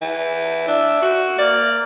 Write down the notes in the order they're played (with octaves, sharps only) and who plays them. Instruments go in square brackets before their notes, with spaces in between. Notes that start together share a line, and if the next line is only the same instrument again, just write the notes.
[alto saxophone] E3
[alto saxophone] D4 [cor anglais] E5
[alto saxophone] F#4
[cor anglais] A#3 [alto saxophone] D5